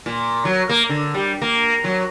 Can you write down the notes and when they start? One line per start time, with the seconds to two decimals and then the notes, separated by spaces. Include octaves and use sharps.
0.06 A#2
0.45 F#3
0.69 A#3
0.89 D3
1.14 G3
1.42 A#3
1.84 F#3